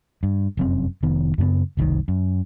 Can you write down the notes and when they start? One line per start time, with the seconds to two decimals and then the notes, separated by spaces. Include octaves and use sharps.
0.23 G2
0.57 F1 F#2 C4
1.03 F1 D#3 B3
1.38 F#2 C#3 A#3 B3
1.77 F#1 C2 B2 D#3
2.08 F#2